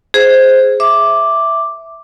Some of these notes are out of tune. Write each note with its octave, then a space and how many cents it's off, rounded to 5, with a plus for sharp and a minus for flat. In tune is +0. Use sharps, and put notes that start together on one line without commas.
G#4 +0 C5 +0
E5 +0 D6 +0